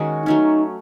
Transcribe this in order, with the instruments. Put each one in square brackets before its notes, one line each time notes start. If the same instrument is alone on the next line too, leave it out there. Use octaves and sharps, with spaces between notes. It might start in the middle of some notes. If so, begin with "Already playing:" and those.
Already playing: [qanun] D#3 G#3 C#4 F#4
[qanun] F#3 A3 C#4 [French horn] D#4